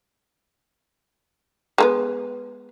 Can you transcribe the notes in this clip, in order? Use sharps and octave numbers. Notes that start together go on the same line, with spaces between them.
G#3 A#3 B3